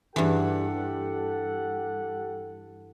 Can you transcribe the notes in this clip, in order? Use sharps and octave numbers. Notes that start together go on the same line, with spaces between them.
G2 E3 G4 A4 F#5